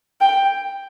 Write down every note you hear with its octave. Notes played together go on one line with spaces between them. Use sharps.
G5